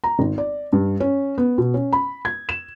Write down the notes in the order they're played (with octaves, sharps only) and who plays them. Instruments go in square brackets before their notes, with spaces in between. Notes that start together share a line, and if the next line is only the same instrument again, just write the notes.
[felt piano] A#5
G#1
D5
G2
C#4
B3
B2
C#4
B5
G#6
E7